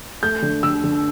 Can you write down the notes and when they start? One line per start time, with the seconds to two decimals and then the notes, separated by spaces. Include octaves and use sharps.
0.23 A3 G6
0.42 D3
0.63 D3 E6
0.84 D3